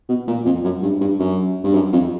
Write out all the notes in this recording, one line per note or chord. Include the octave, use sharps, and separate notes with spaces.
B2
A#2
F2
F#2
G2
G2
F#2
G2
F#2
F2